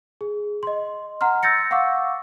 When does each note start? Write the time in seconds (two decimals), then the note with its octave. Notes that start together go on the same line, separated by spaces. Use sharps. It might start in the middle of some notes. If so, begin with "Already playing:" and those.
0.21 G#4
0.63 D#5 C6
1.21 F#5 A#5 C6 F6
1.43 E6 G6 A6 A#6 C#7
1.71 F5 F#5 C#6 D6 E6